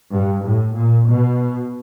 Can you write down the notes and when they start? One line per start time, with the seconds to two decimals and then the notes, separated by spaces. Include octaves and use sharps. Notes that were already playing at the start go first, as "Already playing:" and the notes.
0.12 G2
0.46 A2
0.75 A#2
1.09 B2